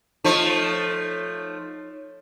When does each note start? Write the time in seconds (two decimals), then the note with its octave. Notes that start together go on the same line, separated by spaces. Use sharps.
0.24 F3 A3 D#4 C#5